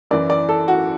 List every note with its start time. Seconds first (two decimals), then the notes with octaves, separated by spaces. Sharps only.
0.11 F#2 E3 D5
0.30 D5
0.49 A4
0.68 F#4